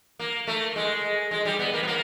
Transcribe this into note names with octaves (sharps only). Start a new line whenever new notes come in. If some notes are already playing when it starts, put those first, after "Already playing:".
A#3
A3
G#3
G#3
G3
B3
A#3
B3
A#3